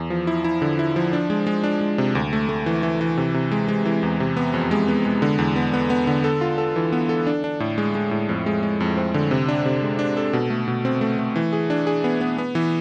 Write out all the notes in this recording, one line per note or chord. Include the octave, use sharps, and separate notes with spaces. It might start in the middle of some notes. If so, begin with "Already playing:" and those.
Already playing: E2
F3
E4
E4
D3
E4
F3
D4
G#3
G#3
D4
G#3
C3
D2
A3
A3
E3
E3
E3
C3
C3
G#3
G#3
E3
E2
C3
B3
F2
G#3
B3
G#3
D3
E2
B3
B3
B3
D3
A4
F4
A4
E3
B3
A4
D4
D4
A2
G#3
G#3
A2
F2
G#3
G#3
F2
C4
D3
C3
D4
C3
G#3
D4
A4
B2
A3
B2
C4
A3
A3
E3
G#4
D4
G#4
B3
B3
B3
E3